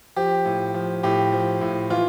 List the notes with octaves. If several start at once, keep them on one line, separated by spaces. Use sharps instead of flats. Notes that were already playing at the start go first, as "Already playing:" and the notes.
F3 G4
A2
F3
A2 G4
F3
A2
E3 F4